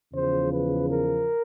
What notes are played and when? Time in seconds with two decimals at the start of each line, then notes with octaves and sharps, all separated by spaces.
0.13 E2 C#3 F3 C5
0.51 B4
0.89 A#4